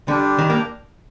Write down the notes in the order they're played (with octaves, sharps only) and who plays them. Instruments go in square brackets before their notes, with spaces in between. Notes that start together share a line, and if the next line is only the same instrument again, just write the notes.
[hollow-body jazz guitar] D3 [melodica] G3 D4 G4
[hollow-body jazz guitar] D#3
A#3